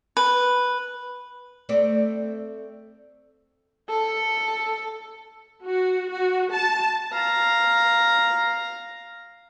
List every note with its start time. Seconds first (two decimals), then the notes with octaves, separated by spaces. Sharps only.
0.17 B4
1.69 A3 C4 D5
3.89 A4
5.65 F#4
6.11 F#4
6.52 A5
7.13 F5 A#5